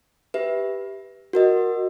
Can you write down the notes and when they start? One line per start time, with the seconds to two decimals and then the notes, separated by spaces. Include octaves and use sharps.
0.34 G4 B4 E5
1.33 F#4 A#4 D#5